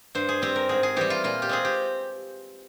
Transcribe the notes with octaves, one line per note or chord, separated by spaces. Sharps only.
G2 C5
G#4
G3 C4 G4
A#4
G#2 G#4
G#4
E3 G3 G4
F4
A#2 F4
G4
G#3 C4 G#4
G4